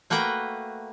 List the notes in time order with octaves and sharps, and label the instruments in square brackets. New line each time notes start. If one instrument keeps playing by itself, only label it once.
[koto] A3 A#3 F#4 B4 G5